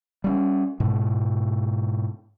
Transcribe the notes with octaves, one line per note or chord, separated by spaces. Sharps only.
G3 C4 C#4
G#2 B2